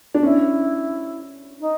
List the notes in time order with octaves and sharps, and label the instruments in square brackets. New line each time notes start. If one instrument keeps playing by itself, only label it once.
[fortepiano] D4
[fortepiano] C#4 [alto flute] E4
[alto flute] D#4